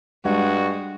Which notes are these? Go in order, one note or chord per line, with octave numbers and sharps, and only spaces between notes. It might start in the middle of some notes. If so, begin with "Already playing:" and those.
G2 G3 G#3 D4 F#4 F#5